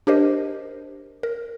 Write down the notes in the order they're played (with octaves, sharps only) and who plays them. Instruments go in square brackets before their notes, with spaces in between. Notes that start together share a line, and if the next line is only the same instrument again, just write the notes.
[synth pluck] D4 G4 A#4 C5 D#5
A#4